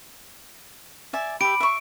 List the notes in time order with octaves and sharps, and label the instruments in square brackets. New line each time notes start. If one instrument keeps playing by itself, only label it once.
[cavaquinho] D5 E5 G#5
[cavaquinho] G4 E5 [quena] B5 [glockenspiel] D7
[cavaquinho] E5 C#6